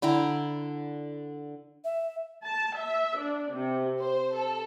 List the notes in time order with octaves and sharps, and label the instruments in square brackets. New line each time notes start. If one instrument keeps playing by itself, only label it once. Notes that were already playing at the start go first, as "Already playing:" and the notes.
[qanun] D3 E4 G5 A#5
[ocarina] E5
[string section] A5
E5
D4
C3
C5
A4